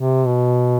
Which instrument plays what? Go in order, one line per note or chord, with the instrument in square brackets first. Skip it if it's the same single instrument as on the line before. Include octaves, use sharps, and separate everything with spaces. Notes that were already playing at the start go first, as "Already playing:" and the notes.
Already playing: [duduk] C3
B2